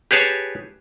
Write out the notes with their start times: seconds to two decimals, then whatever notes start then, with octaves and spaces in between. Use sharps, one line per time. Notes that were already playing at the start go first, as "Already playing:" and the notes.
0.11 G4 G#4 B4 C#5 A5